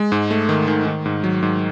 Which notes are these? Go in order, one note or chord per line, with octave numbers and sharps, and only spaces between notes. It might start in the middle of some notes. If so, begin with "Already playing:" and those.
Already playing: G#3
G#2
A3
D#3
D#3
D#3
G#2
F#3
G#2